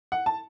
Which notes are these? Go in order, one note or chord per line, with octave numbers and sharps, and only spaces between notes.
F#5
A5